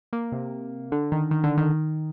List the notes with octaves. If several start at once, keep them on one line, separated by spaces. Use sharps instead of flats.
A#3
C3
D3
D#3
D#3
D3
D#3